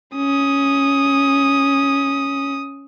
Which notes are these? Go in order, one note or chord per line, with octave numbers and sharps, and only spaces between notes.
C#4 D#6